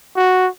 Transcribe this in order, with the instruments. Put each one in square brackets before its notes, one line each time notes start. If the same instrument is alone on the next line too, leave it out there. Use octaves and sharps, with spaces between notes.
[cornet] F#4